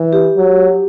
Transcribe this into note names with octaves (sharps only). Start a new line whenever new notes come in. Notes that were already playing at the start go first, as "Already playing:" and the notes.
Already playing: E3
G4
F#3